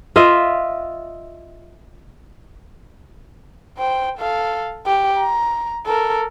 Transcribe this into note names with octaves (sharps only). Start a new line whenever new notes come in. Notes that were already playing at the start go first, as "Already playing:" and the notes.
F4 D#5 E5
C5 G5
A4 F5
G4
A#5
A4 A#4